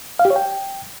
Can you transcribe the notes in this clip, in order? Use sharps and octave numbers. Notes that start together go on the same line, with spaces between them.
F5
G4
C#5
G5